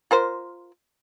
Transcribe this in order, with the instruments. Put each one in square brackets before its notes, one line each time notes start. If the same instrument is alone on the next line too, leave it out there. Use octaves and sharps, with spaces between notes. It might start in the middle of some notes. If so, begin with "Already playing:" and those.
[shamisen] F4 A#4 C5